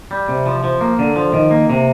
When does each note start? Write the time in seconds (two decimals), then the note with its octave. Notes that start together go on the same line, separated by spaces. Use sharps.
0.11 G3
0.29 C3
0.46 F3
0.64 F3
0.81 A#3
0.99 D3
1.16 F3
1.33 D#3
1.51 A#3
1.70 C3